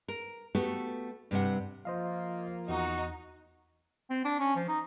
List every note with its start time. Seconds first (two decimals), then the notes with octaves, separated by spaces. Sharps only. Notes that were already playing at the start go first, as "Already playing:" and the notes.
0.08 A#4
0.55 A3 B3 F#4 G4 A4
1.31 G2 C3 D4 F#5
1.85 F3 A#3 F4 C5 D#5 F5
2.69 E2 D#4 F#4
4.10 C4
4.25 D4
4.40 C#4
4.56 F3
4.69 D#4